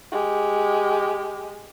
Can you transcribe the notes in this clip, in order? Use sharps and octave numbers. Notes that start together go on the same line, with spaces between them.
G#3 G4